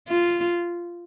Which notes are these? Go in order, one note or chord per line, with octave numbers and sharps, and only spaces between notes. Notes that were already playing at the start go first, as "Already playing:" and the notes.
F4